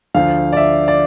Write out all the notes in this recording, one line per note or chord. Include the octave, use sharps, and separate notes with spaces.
D2 D3 F3 F5
D5
E5
D5